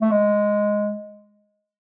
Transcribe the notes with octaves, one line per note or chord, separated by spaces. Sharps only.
A3
G#3